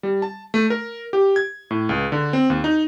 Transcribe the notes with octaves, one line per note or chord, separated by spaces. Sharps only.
G3
A5
A3
A#4
G4
G#6
A2
C#2
D3
C4
D#2
D#4